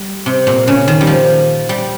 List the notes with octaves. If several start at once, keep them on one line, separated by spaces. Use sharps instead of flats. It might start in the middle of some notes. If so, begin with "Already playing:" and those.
Already playing: G3
C3
A#2
C#3
D#3
G3
F3
G3